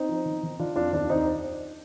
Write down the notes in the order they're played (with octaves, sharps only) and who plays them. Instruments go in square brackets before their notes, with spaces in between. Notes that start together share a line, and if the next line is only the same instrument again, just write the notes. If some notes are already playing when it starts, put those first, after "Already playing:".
Already playing: [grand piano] C4 D#4
F3
D#3
D#3
D#3 D4 F4
F2 D4 F4
D#2 D4
D#2 C4 D#4